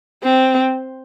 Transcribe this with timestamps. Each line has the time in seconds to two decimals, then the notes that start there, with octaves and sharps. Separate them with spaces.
0.24 C4